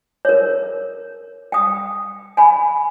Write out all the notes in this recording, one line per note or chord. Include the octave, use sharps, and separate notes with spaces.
A#4 C#5
G5 D#6
G#5 B5